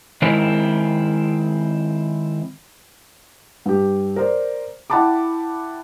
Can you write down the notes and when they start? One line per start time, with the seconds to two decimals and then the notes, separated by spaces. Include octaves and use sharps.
0.22 D#3 G#3 C4 E4 A#4
3.66 G2 G4
4.16 A#4 C5 D5
4.90 E4 F#5 G5 A5 B5 D6